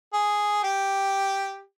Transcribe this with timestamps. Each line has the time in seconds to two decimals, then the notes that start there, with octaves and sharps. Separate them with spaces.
0.14 G#4
0.64 G4